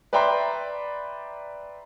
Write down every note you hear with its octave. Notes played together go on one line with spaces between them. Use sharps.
B4 D5 E5 G5 A#5 C6